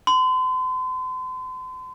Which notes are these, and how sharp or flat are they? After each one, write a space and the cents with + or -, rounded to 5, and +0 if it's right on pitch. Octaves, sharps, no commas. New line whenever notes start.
C6 -40